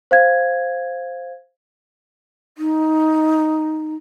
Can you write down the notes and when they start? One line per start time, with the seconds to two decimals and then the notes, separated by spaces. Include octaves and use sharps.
0.11 C5 F5 G#6
2.57 D#4